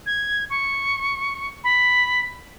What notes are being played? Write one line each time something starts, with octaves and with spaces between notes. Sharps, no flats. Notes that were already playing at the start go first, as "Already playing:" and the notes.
G#6
C#6
B5